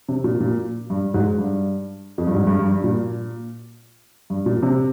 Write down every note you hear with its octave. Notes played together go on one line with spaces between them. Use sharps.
C3
A#2
A#2
G2
G#2
G2
F2
G2
G#2
G2
G2
G2
A#2
G2
A#2
C3